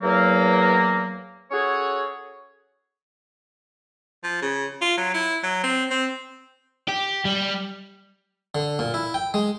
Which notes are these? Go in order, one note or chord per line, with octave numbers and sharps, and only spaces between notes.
E2 F#3 A#3
C#4 F#4 G#4 A4 C#5
F3
C#3
F4
F#3
E4
F#3
C4
C4
G4
G3
D3
A#2
E4
G5
G#3